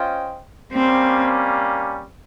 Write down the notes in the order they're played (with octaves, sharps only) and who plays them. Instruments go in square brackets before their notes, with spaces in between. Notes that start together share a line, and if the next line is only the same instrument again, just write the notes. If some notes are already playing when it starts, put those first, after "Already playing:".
Already playing: [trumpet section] C#4 F4 C5 D#5 G5
[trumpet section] G3 A#3 C#4 [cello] C4